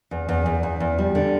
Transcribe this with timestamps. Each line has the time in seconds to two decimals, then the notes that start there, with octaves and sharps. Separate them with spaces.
0.11 E2
0.29 E2
0.46 E2
0.63 E2
0.80 E2
0.98 G3
1.15 D3